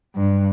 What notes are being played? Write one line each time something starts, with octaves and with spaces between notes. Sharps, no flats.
G2